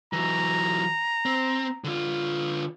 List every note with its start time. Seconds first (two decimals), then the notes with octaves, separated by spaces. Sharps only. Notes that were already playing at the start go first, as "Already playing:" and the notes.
0.13 E3 F#3 A#5
1.25 C4
1.84 D3 F4